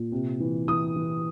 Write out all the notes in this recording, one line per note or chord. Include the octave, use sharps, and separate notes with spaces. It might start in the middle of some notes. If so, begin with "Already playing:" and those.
Already playing: A#2
C3
E3
E3 D#6
E3